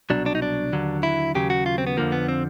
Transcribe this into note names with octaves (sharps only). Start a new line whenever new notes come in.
C2 B2 F#3 D4
D4
D#4
D4
D#2 D3 F#3
E4
D#2 C#3 F#3 G4
F#4
F4
C4
B3
F2 D3 F3 A#3
B3
C4